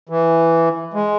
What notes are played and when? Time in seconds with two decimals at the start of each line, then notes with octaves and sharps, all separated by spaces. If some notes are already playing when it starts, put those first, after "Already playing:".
0.09 E3
0.94 G#3